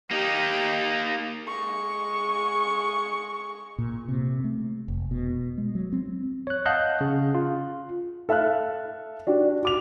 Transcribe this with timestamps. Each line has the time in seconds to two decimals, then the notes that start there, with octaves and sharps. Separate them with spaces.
0.11 A#3 D#4 G4
1.48 G#3 C#6
3.78 A#2
4.08 C3
4.44 A3
4.88 F1
5.11 B2
5.58 G#3
5.75 F#3
5.92 C4
6.47 C#5 F#6
6.66 D#5 F5 F#5 A5 F#6 G6
7.01 C#3
7.35 F4
8.29 A4 E5 F5 F6 F#6
9.27 D4 F#4 G4
9.63 F#4 D6 F7